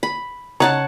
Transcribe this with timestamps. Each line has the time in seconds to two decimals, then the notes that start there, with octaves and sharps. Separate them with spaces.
0.03 B5
0.60 C#3 F#3 D#4 C#5 F#5 A5